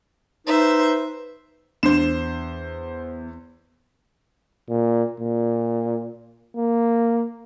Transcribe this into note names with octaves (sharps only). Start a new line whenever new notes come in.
D#4 B4 C5 E5
E2 D4 C5 C7 E7
A#2
A#2
A#3